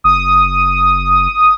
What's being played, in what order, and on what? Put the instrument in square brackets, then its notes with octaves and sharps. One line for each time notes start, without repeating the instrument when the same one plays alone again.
[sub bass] F#1 [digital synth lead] D#6